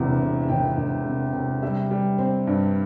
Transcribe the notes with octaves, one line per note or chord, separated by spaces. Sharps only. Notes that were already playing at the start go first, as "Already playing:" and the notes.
Already playing: E1 E2 C3
C3
E5
E1 G5
E1
C3
C3
G3 E5
G3
C4
G2